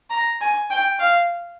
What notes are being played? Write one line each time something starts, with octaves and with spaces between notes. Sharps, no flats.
A#5
G#5
G5
F5